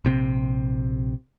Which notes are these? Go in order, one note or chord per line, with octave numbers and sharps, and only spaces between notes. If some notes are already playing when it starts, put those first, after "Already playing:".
A#1 C3 C4